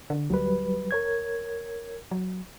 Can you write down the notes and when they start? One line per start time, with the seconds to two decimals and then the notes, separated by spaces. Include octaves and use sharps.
0.10 D3
0.30 D2 F#3 G3 B4
0.91 A#4 C#5 G#6
2.11 F#3